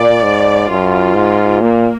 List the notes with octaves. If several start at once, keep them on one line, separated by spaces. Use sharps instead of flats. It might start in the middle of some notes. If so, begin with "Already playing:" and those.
Already playing: A#2 D5
G#2
F#2 F4
G#2
A#2 A#3